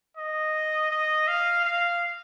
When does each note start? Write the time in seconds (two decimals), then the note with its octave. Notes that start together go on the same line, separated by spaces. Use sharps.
0.17 D#5
0.91 D#5
1.28 F5
1.64 F5